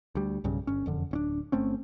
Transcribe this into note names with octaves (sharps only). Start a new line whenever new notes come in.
D2 G3
B1 G2 C#3
G1 C#4
E1 F2 D3
D1 C#4 D4
G1 A3 C4 C#4